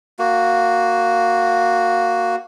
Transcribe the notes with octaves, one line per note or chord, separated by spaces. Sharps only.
A#3 F#4